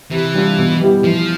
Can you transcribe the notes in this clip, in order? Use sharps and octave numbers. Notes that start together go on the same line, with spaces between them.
C3 E3
G3 D4 F4
B2
G3 B3 E4 G4
E3 F3